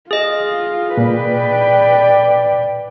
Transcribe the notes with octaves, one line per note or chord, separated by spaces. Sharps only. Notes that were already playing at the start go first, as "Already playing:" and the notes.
F4 G#4 D#5
A#2 B4 D5 G5